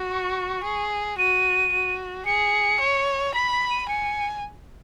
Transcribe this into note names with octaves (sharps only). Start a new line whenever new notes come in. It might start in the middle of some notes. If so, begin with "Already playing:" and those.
Already playing: F#4
C#6
G#4
F#4 D#7
F#4
G#4 C#7
C#5
B5 B6
B6
D#7
G#5 C#7